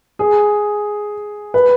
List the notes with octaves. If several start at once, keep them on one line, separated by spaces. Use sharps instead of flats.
G#4
B4